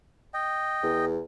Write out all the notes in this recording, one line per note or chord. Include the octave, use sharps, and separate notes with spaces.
D#5 G5
E2